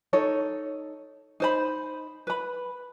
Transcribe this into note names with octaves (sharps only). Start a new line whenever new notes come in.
D#4 A4 C#5
D#4 C5 B5
B4 B5